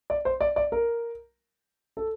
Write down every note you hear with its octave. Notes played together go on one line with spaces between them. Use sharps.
D5
C5
D5
D5
A#4
A4